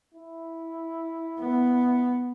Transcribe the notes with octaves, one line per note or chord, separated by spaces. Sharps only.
E4
B3